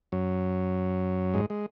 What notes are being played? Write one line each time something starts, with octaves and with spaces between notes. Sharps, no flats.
F#2 F#3
G#2 G#3
G#3